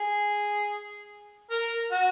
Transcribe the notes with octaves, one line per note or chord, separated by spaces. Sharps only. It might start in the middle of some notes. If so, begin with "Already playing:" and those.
Already playing: G#4
A#4
F#4